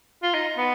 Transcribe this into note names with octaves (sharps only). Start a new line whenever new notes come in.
F4
D#4
B3